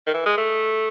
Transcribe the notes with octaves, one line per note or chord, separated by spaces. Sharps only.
D#3
E3
G#3
A3